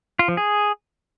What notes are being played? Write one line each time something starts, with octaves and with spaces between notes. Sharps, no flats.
F4
F3
G#4